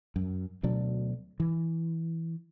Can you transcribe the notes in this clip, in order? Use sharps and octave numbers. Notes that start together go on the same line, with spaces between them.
F#2
D2 B2 F#3 D4
E3